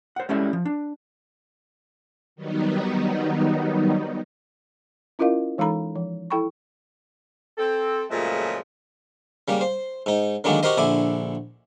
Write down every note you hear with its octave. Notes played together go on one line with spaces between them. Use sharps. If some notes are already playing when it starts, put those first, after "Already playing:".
C5 F#5
G3 G#3 C#4 E4 A4 E5
F3
D4
D#3 F#3 G3 B3 D#4
C#4 E4 F4 A#4 D#5 F5
E3 G#3 D#4 A4 A#5 B5
F3
E4 A4 G5 B5 C#6
C4 A4
A#2 C#3 F3 F#3 G#3 A3
C#3 G3 A#3
C5
G#2 D#4
D3 D#3 F#3 G#3 A#3 D4
F#4 G4 A#4 C5 D#5
A#1 D3 E4 G#5 D6